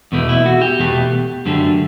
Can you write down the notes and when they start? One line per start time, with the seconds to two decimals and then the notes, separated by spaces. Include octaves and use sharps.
0.12 E2 B2 A3
0.29 E4
0.46 F#4
0.62 G4
0.79 E2 B2 A3
1.46 F#2 D3 A3